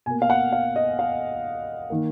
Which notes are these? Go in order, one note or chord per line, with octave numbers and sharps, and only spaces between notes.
B2 A#3 G#5
F5
F#5
F5
D#5
F5
D#3 A#3